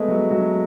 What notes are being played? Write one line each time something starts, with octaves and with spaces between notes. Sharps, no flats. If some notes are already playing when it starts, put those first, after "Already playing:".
Already playing: G#3 A3 B3
F#3
F#3